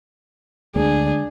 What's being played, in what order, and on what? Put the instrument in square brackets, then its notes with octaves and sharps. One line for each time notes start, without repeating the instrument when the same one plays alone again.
[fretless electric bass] D2 [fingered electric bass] D3 G#3 [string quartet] D4 [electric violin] G#4